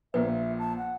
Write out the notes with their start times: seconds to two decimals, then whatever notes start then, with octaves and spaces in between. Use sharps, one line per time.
0.14 A#1 A#2 B4 E5
0.59 A5
0.77 F#5